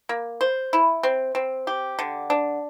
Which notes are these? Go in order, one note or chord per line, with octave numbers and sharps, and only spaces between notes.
A#3
C5
E4
C4
C4
G4
D3
D4